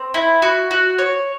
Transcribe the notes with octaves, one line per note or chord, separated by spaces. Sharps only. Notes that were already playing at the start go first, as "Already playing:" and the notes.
Already playing: C4
E4
F#4
F#4
C#5